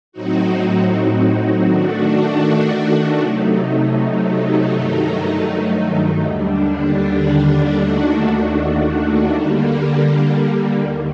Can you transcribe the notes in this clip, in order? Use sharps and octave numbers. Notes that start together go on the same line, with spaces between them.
A2 F#3 C4 D#4 F#4
D#3 A3 D4 F#4
C3 F#3 A3 D#4
G2 D#3 F#3 A3 D#4
D#2 D3 G3 D4
D#2 D#3 A3 D4 F#4
D3 G3 A#3
D#2 D#3